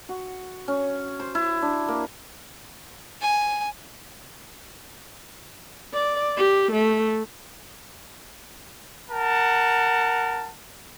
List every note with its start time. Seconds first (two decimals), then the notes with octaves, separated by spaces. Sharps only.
0.09 F#4
0.68 C#4
1.20 C5
1.35 E4
1.62 D4
1.88 A#3
3.22 G#5
5.94 D5
6.37 G4
6.72 A3
9.11 A#4 F#5 A5